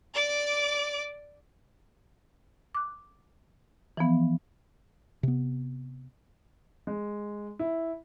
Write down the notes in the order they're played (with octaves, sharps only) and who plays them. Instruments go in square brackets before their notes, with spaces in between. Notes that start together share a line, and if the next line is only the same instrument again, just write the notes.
[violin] D5 D6
[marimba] D6 F#6
E3 F3 B3
[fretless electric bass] C3 B3
[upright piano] G#3
E4